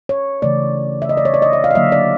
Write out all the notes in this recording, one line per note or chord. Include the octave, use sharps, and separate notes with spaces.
C#5
C#3 E3 A3 D5
E5
D#5
D5
C#5
D5
D#5
E5
F5
D#5
D3 F#3 A#3 E5
D5